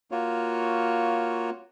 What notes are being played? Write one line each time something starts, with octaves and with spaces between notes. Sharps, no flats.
A#3 F4 F#4 C#5